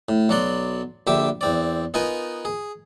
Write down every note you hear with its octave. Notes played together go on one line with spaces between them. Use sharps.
A2
B1 F#3 F#4 D5 C6
A#1 D3 G4 E5 D6
E2 C4 D5
B3 D#4 F4 A#4 G#5
G#4